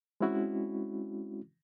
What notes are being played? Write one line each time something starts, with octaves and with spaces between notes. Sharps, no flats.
G#3 C4 C#4 E4 F#4